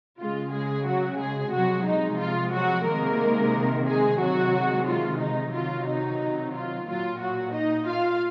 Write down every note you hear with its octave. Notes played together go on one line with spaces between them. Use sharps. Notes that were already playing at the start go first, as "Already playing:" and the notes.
C#3 G#3 F4
G#3 G#4
F#3 F#4
G#3 G#4
C3 F3 F#3 G#3 F#4
D#4
F4
F#3 F#4
C3 D#3 G#3 A#3 A#4
G#3 G#4
C3 D#3 F#3 G#3 F#4
F4
D#4
C3 D#3 F#3 F4
D#4
F4
A#2 F#3 F4
F#3 F#4
D#4 D#5
F4 F5